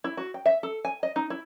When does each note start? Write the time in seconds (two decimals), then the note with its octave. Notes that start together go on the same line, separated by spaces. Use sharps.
0.04 E4
0.17 F#4
0.34 G5
0.46 E5
0.63 A4
0.85 G#5
1.03 D#5
1.16 D#4
1.30 E4